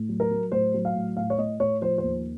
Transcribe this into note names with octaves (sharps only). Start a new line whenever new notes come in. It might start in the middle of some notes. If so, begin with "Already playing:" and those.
Already playing: A2
F#3
A#4
F#3
A2 C5
F#3
F5
A2
A2 F5
C#5
A2 D#5
A2 C#5
F3 C5
D#2 C5